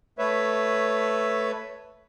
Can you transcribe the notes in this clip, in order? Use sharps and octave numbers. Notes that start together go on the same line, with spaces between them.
A3 B4 C#5 E5